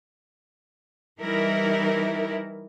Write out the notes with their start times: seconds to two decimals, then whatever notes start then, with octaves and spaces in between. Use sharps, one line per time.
1.20 E3 G3 D#4 E4 A#4